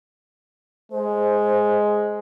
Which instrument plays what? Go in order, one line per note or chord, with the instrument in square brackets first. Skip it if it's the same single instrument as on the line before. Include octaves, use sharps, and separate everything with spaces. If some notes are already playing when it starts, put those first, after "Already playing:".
[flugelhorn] G#3 [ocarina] C5